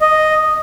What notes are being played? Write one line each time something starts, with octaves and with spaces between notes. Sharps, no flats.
D#5